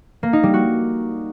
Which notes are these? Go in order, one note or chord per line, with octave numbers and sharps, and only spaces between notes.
A#3
D#4
G3
F#4